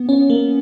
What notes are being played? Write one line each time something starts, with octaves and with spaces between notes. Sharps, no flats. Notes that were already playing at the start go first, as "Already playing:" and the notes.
Already playing: B3
C#4
A#3